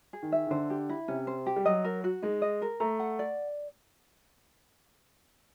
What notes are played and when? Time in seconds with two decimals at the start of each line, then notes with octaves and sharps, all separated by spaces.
0.13 G#4
0.23 D#3
0.32 E5
0.47 D#3
0.51 D3 C5
0.70 G4
0.89 E4
1.08 C3 C#4
1.27 C5
1.46 G4
1.56 G3
1.65 F#3 D#5
1.84 A#4
2.04 F#4
2.22 G#3 D#4
2.42 D#5
2.62 A#4
2.80 A3 A#5
3.00 F#5
3.19 D5